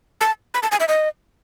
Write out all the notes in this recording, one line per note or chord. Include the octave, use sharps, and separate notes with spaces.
A5
B5
A5
G#5
E5
D#5